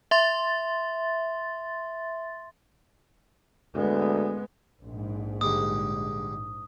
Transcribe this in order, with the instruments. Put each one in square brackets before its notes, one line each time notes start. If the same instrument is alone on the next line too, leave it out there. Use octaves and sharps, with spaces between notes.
[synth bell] E5 C6 A6
[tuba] D2 [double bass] G#3 B3
[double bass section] A#1 G#2
[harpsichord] D3 G3 G#3 [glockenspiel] D#6